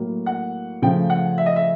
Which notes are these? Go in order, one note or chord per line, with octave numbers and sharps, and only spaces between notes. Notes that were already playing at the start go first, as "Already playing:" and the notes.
Already playing: A2 F#3 A#3
F#5
C#3 F3 A3 G5
F#5
E5
D#5
E5